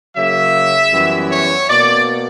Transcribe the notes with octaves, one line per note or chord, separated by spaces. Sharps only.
C#3 F#3 A#3 E5
F#2 E3 G3 B3
C#5
B2 A#3 D5